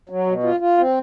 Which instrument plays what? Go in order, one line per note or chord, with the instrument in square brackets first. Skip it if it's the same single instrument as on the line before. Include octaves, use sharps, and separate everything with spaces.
[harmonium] F#3
B2
F4
F4
C4